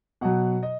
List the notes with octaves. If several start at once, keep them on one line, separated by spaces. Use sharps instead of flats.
B2 F#3 F#5
D#5